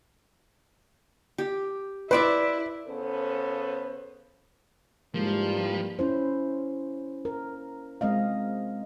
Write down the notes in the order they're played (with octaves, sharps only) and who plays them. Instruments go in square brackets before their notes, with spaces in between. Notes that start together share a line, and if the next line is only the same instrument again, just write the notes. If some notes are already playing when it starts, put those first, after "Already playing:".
[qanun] G4
[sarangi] E4 [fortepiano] B4 [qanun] C5 D5 E5
[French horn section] C#3 B3 C#4 A4 C5
[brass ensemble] G#2 E3 G3 [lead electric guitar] F3 [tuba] G#3 [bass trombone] A#3
[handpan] C#4 E4 C5
A#4
G#3 C4 D#5 F5